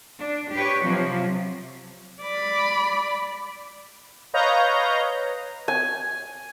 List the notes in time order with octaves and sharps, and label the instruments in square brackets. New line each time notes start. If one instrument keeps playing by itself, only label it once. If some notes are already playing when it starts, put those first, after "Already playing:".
[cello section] D4
G4 B4 C#5
C3 F3 F#3
[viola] D5 B5
[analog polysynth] B4 C#5 D#5 F5 A#5 G6
[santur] G#5